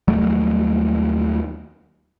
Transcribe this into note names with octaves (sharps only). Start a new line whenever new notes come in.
D#2 F#3 G3 A3